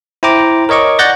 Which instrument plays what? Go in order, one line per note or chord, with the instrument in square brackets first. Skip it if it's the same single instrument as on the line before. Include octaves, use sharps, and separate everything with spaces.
[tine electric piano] E4 C5 G5 A#5 D6
A#4 C#5 D#5 C#6 D6
D5 F#5 F#6 G6 A6 A#6